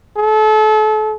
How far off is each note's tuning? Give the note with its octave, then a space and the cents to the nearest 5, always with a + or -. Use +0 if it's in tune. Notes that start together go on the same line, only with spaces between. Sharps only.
A4 -35